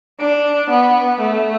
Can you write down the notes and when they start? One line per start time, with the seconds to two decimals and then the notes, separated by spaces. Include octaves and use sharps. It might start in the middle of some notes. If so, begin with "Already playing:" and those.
0.20 D4
0.70 B3
1.21 A3